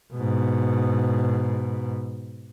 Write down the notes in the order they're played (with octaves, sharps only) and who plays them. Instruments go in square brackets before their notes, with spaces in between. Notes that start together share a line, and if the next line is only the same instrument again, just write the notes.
[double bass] G#2 B2